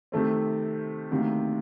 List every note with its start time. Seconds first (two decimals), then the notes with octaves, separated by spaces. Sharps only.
0.12 C3 D#3 A3 C4
1.11 D2 C3 D#3 A#3